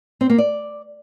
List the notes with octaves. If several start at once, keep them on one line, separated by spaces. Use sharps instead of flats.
C4
A#3
D5